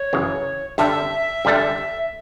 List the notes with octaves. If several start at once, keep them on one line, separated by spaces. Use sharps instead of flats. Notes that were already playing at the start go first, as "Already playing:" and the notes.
Already playing: C#5
F#2 C#3 E3
G2 D3 G3 D4 A4 E5
G2 D3 G3 D4 A4